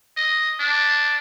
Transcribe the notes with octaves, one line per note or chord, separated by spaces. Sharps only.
D#5
D4